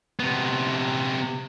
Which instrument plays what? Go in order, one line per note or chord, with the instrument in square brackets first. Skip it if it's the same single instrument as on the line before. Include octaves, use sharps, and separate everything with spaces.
[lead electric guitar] C3 B3